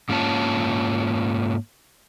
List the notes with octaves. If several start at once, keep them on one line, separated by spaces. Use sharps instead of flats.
G#2 A#3 C#4 F4 C#5 A5